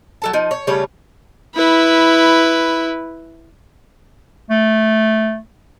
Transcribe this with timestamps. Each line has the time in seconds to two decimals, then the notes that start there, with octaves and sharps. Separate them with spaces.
0.22 F#3 A4 A5
0.33 F3 D#4
0.51 C#5
0.67 C#3 G3 A3 C#5
1.55 E4 B4
4.50 A3